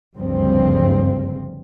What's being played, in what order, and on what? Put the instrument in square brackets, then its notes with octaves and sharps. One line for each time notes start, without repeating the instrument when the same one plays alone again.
[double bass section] F#1 D2 G2 C#3 F3 C4